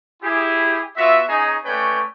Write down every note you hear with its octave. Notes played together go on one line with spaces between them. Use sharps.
E4 G4 G#4
B3 F4 F#4 E5
C#4 D#4 G#4
A3 C#4 B4 C#5 D5 G5